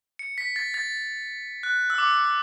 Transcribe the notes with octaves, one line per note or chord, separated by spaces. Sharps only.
C#7
B6
A6
A6
F#6
E6
D6